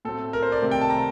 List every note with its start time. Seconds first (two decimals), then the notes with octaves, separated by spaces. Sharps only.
0.05 A2 F#3 A3 C4 A4
0.33 A#4
0.43 C5
0.52 D5
0.62 C3 D#3 A3 C4
0.71 G5
0.81 A5
0.90 A#5